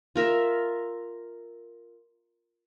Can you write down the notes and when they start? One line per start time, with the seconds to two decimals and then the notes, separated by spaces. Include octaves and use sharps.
0.16 F4 A#4 E5